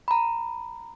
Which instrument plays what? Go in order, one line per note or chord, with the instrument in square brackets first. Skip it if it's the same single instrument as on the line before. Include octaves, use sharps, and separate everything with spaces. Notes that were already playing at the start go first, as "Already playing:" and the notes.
[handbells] A#5 B5